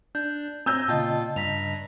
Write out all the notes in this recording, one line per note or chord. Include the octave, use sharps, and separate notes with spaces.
D4 G6
C4 G#5 A#5 E6 G6
A#2 C#3 F4 D#5 G5 A5
G2 A#5 B6 F7